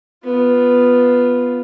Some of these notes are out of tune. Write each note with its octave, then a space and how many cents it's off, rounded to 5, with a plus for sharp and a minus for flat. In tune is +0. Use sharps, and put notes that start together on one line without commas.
B3 +0 F4 +0